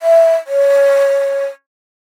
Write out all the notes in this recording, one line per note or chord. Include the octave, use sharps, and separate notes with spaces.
E5
C#5